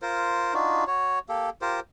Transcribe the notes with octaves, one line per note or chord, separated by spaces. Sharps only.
F4 A#4 C5
D4 D#4 F4 F#4
F#4 C#5
A#3 G4 A4
F4 G4 A#4 C5